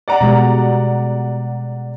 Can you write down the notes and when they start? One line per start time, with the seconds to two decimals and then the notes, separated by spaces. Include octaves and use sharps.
0.08 D5 F#5 A#5
0.21 B2 G3 G#3